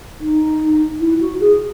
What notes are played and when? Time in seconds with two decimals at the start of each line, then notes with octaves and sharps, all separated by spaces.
0.21 D#4
1.00 E4
1.21 F#4
1.41 G#4